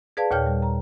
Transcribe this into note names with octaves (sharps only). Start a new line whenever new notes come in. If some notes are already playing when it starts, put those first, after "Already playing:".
G#4 B4 D5 F5 A5
D#2 A#2 C#5 G5 F6 G6
G3
A#5